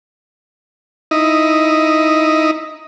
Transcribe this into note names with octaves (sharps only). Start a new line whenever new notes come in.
D#4 E4 D#5